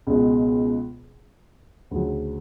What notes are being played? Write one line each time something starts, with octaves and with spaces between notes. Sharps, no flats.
C#2 B2 G#3
D2 C#3 F#3